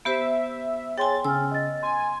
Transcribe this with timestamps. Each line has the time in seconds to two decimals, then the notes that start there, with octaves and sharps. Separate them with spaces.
0.05 B3 G4 C5 E5
0.98 G#4 C#5 G5 G#5 C6 A6
1.25 C#3 G#5 E6 F6
1.51 D#5 A6
1.83 G#5 C6